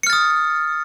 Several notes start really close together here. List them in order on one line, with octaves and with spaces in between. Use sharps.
C#7 F6 A6 D#6